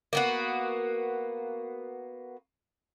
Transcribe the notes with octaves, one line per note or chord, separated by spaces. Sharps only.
A#3 B3 F#4